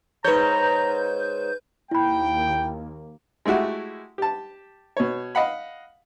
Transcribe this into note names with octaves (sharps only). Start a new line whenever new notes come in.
G#2 B4 C#5 A#5 G6
D#2 A#3 E4 G5 B5
G#3 A3 E4 F#4 G4
G4 A5
B2 C#5
D#5 F5 F#5 B5